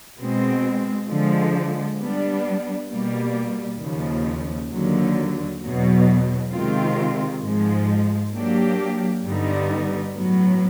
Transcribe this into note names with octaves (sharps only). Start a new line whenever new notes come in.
B2 G#3 C4
D3 F3 G#3
G3 B3 D4
B2 G3 A#3
D#2 C#3 F3
D#2 D3 F#3
E2 B2 F#3
C3 D#3 G#3 C4 F4
G#2 F3 G#3
F#3 A#3 D4 G4
G2 D3 G3 B3 D#4
A2 F#3 B3